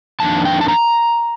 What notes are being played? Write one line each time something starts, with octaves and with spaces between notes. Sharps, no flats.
F2 D#3 A#3 D4 A5
G5
A5
A#5